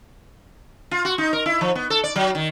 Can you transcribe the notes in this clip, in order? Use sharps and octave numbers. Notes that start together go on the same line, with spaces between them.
F4
F#4
D#4
A#4
E4
F3
B3
A4
D5
F#3
D#3